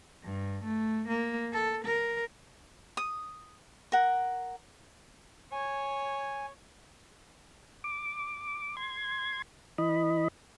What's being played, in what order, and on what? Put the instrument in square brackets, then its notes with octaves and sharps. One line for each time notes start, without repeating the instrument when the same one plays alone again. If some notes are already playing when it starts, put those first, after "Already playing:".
[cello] G2
A3
A#3
A4
A#4
[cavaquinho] D#6
A#4 F#5
[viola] C#5 [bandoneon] G#5
[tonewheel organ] D6
C6 G#6
E3 D#5 B5